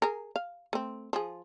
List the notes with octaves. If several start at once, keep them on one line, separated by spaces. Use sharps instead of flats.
G#4 A#4
F5
A3 C4
F3 G#4